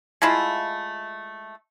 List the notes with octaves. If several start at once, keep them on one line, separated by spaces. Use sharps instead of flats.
G#3 A3 E4 F4